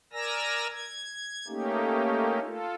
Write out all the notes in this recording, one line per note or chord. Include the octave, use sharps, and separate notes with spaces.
A#4 D5 G#5 A#5 E6 A#6
G#6
A3 A#3 C#4 D#4 G4
F4 A4